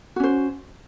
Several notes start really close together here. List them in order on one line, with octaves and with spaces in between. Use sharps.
F#4 C#4 C5